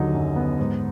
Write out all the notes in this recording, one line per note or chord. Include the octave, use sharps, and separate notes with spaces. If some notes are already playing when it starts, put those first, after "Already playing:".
Already playing: D#2 D3 F#3 D#4
F#2
B3
G#2